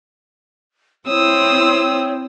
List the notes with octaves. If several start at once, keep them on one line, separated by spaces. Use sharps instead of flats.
C4 E4 C#5 D#6 E6